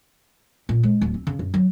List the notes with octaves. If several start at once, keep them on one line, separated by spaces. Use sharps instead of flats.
A#2
G#3
D1
C4
C#3
F#2
F#3